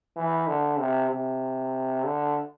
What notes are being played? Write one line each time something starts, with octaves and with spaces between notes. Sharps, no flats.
E3
D3
C3
C3
D3